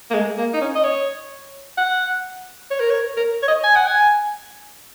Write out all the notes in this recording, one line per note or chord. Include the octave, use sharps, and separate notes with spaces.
A#3
G#3
A#3
D#4
C#4
D#5
C#5
F#5
C#5
A#4
C#5
A#4
C#5
D#5
G#5
F#5
G#5